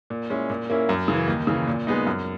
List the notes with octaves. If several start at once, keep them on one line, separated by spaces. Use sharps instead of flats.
A#2
G#3 C#4 E4
A#2
A#3 C#4 E4
F#2
C#3 E3
D#2
C#3 E3
A#2
G#3 B3 D#4
F#2